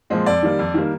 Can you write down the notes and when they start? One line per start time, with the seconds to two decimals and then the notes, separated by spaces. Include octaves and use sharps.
0.10 A#2 F3 G#3 C4
0.26 F2 D5
0.43 D#3 G3 A#3
0.59 F2
0.74 D#3 G3 A#3